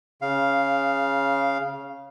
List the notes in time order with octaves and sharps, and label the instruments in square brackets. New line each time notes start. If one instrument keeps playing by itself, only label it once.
[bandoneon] C#3 F5